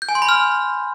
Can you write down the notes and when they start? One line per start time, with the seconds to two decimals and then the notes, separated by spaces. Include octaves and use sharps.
0.02 G6
0.09 G#5
0.15 C6
0.22 B5
0.29 F6